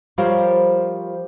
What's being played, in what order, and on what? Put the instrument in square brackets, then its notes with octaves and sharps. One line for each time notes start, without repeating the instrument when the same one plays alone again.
[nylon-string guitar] F3 G3 F4 A#4 C5 C#5